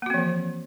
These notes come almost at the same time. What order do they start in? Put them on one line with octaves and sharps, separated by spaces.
A#3 F#4 C4 F3 E3